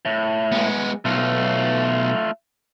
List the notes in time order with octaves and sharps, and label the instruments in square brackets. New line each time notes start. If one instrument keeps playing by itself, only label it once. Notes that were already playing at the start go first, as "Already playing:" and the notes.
[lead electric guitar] A2
[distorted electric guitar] G#3 B3
[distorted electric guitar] B1 [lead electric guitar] A3 F4